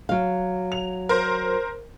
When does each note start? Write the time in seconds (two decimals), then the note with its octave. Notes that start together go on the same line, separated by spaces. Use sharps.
0.09 F#3 F5
0.72 F7
1.09 A#4 C5